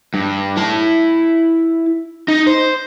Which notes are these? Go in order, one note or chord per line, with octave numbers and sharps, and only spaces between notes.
G2
E4 A5
D#4
C5